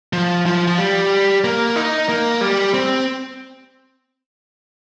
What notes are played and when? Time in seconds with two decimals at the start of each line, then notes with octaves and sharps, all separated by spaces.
0.13 F3
0.46 F3
0.67 F3
0.78 G3
1.44 A#3
1.76 D#4
2.09 A#3
2.41 G3
2.74 C4